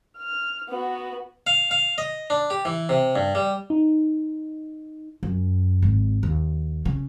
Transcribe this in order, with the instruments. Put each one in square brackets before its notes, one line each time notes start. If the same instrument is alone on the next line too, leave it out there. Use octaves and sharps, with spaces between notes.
[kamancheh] F6
B3 F#4
[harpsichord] F5
F5
D#5
D4
G4
E3
C3
G2
G3
[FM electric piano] D#4
[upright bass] F#2
G#1
D#2
C#3